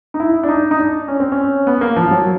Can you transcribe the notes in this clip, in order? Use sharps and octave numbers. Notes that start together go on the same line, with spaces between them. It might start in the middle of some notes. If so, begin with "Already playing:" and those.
D#4
E4
D4
D#4
D#4
D4
C#4
C4
C#4
B3
A#3
F3
F#3